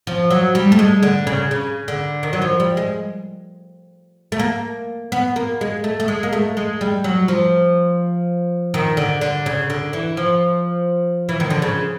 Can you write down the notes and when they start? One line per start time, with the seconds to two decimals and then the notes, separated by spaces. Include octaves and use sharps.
0.07 F3
0.30 F#3
0.55 G3
0.72 A3
0.79 G#3
1.03 D3
1.27 C#3
1.51 C#3
1.88 D3
2.23 D#3
2.33 F#3
2.42 F3
2.60 G3
2.77 G#3
4.32 A3
4.39 A#3
5.12 B3
5.36 A#3
5.61 G#3
5.84 A3
6.00 A3
6.08 G#3
6.23 A#3
6.33 A3
6.57 G#3
6.81 G3
7.04 F#3
7.28 F3
8.74 D#3
8.97 D3
9.21 D3
9.46 C#3
9.70 D3
9.93 E3
10.17 F3
11.29 E3
11.40 D#3
11.50 D3
11.62 C#3